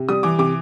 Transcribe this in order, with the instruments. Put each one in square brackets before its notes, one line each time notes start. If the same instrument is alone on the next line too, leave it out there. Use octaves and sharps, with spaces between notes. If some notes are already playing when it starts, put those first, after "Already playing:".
Already playing: [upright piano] C3
G3 D#6
E3 D6
C3 D6